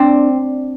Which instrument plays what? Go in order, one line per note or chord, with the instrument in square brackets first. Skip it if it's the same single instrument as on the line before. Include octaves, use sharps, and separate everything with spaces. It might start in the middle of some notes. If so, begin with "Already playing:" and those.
Already playing: [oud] C4 D4